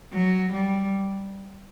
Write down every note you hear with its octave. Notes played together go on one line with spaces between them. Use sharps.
F#3
G3